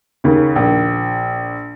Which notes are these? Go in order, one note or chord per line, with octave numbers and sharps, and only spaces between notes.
D#2 C#3
A#1